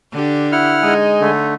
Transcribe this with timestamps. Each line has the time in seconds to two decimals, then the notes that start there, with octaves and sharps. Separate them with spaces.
0.13 D3 D4 G4
0.52 E4 F#5 F6
0.83 G#3 D#4 D#5 G#5
1.21 D3 A3